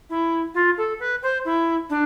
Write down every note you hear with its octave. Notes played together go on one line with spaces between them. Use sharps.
E4
F4
A4
B4
C5
E4
D4